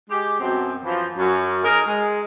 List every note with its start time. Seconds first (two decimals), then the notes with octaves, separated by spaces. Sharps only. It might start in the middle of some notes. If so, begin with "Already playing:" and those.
0.10 G#3 G4
0.40 F#2 B2 C4
0.85 F#2 E3 F3
1.18 F#2
1.65 D#4 G#4 A#4
1.87 G#3